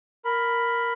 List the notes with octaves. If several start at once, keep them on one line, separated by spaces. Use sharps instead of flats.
A#4 B5